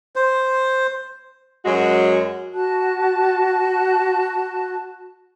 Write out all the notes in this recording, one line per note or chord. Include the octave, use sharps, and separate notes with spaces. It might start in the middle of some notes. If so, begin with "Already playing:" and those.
C5
F#2 F#3 G#3 F#4
F#4 A5 F#6